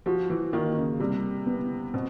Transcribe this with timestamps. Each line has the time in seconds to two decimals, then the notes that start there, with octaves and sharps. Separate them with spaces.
0.06 F3 F#4
0.30 E3
0.53 D#3 A#3
0.76 C#3
1.00 C3 G3
1.47 B3
1.94 B2 C4